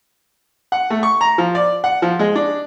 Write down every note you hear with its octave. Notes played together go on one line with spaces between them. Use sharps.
F#5
A3
C#6
A#5
F3
D5
F#5
F3
G#3
D4